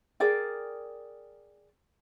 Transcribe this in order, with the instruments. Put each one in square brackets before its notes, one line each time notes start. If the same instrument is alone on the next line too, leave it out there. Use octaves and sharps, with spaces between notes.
[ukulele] G#4 A#4 D5 G5